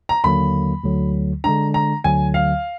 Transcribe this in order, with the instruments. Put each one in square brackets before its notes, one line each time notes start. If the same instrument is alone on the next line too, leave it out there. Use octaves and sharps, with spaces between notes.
[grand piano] A#5
[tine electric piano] D#2 D3 F#3 A#3 [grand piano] B5
[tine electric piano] D2 D3 F#3
[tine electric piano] D3 G#3 D4 [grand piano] A#5
[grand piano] A#5
[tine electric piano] D2 D3 F#3 [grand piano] G#5
[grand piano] F5